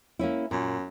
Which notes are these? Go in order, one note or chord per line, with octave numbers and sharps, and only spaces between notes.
A#3 C#4 E4
F#2 A#2